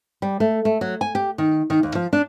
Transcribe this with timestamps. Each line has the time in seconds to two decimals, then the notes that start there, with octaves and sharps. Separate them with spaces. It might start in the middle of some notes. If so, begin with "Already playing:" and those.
0.22 G3
0.40 A3
0.65 A3
0.81 F#3
1.01 G#5
1.15 G4
1.38 D#3
1.70 D#3
1.83 D#2
1.95 F3
2.13 D4